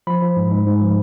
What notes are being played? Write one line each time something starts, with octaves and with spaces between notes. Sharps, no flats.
F3 B5
F3
G#2
G#2
G#2
F3